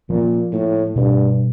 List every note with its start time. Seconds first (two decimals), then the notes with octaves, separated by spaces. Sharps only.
0.10 A#2 F3 A#3 C#4
0.53 A2
0.96 G2 B2 G3 C4